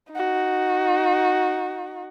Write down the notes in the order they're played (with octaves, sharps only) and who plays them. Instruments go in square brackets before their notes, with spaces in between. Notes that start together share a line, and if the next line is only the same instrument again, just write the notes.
[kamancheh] D#4 F#4